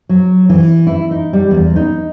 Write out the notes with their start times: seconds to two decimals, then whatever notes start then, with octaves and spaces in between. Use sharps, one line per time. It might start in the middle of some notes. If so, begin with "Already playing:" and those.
0.09 F#3
0.49 E3
0.87 E4
1.11 D#4
1.33 G3
1.51 E2
1.76 D#4